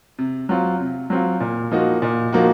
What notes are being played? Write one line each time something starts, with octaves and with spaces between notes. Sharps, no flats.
C3
F#3 C4 F4
C3
F#3 C4 F4
A#2
F3 A#3 D#4 F#4
A#2
F3 A#3 D#4 F#4